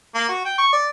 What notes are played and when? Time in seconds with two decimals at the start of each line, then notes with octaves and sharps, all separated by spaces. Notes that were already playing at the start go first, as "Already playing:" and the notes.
0.15 A#3
0.29 F#4
0.45 G5
0.58 C#6
0.73 D5